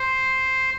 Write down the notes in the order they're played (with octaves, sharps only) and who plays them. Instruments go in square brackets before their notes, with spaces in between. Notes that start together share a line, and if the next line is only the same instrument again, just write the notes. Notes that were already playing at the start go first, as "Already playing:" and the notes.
Already playing: [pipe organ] C5